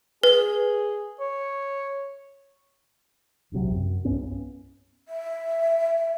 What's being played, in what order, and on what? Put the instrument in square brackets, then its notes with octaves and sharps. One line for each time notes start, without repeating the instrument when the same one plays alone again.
[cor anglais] G#4 [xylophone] B4
[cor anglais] C#5
[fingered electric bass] D#1 A#1 C3 F#3
F#2
C2 G2 B3 C#4
[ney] E5